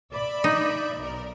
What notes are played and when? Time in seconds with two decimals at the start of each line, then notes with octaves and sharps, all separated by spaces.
0.12 D5 E5 B5
0.44 D#4
0.99 B1 A#4